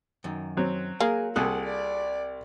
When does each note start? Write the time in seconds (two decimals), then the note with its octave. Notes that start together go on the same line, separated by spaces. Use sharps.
0.24 F#2 D#3
0.57 F#3 C4
1.00 A#3 G#4
1.36 C2 F4 G#4 A4 F#5 D#6 F#6
1.65 D5